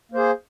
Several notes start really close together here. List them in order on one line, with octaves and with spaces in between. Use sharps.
A#3 C5 G#4